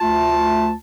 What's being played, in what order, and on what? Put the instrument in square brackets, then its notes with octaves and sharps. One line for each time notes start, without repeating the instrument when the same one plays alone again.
[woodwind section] D2 A3 F4 A5